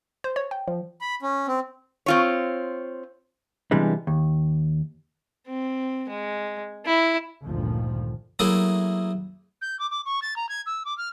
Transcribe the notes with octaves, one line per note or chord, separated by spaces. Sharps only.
C5
C#5
G5
F3
B5
C#4
C4
C4 F4 C#5
C3 E3 G3 G#3 B3 D4
D#2
C4
G#3
E4
G1 D2 A#2 D3 D#3 F3
F#3 A3 A#3 E4 G#4
G6
D6
D6
C#6
A6
A#5
G#6
E6
D6
F6